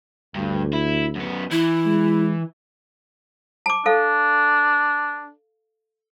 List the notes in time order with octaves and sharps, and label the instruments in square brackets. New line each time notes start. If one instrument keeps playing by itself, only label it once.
[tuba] D2 [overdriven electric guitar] G2
[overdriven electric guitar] E4
F#2 B3
[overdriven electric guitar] E3 [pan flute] E4
[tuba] G#3
[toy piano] A5 D6
[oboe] D4 [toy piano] A4 F5